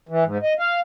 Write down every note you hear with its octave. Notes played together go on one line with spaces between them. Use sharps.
E3
G#2
D#5
F5